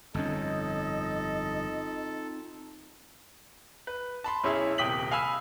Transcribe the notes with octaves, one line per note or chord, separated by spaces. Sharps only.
G1 F2 C4 C#4 D#4 F4 A4 D#5
B4
A5 B5 C6
B1 C#4 E4 G#4 E5
D#1 C3 G5 D#6 B6 F#7
F5 G#5 B5 E6